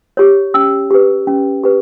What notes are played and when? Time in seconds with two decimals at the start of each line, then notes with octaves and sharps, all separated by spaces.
0.17 G4 C#5
0.54 C#4 E6
0.91 G4 B4
1.27 C#4
1.64 G4 B4